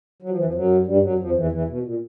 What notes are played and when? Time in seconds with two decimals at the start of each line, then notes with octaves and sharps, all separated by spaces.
0.22 F#3
0.29 F3
0.37 E3
0.45 F2 F3
0.54 F#2 F#3
0.86 G2 G3
1.02 F#2 F#3
1.19 F2 F3
1.36 E2 E3
1.52 E2 E3
1.67 B2
1.83 A#2